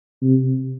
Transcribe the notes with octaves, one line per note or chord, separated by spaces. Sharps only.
C3